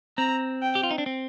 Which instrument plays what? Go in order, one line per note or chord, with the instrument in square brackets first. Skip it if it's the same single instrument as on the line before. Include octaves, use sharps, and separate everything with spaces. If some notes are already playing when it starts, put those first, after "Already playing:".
[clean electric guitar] C4 [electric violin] A#5
[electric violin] G5
[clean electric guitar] G4
F4
D#4
D4
C4